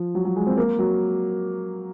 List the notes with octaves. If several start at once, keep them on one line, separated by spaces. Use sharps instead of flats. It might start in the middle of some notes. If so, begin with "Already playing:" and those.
Already playing: F3
F#3
F#3
G#3
C4
A#3
F#3